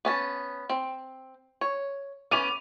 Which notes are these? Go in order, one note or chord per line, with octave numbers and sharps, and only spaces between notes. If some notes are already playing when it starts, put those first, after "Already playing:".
B3 C#4 A5
C4
C#5
B3 C#4 D6 D#7 F7